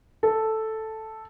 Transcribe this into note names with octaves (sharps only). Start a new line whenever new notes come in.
A4